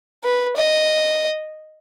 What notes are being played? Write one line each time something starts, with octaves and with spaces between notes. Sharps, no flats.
B4
D#5